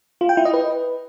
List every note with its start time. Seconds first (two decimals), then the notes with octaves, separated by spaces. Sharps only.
0.21 F4
0.29 G5
0.37 E4
0.45 D#5
0.54 B4